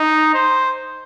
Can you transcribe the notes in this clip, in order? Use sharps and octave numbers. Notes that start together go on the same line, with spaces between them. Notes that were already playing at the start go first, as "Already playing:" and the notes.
Already playing: D#4
C5